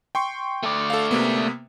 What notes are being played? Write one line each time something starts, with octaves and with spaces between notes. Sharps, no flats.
G5 C6 C#6
A3 D5
A4 F5
C3 A#3 B3